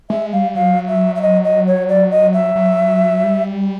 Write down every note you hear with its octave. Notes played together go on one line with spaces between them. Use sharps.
G#3 E5
G3 F5
F#3 F5
E5
E5
D#5
D#5
C#5
D5
D#5
E5
F#3
G3